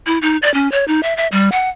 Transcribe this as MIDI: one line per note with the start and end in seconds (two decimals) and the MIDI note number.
0.07 0.18 64
0.22 0.37 63
0.42 0.53 74
0.54 0.70 61
0.72 0.85 73
0.88 1.01 63
1.03 1.15 76
1.17 1.27 76
1.32 1.49 55
1.52 1.69 78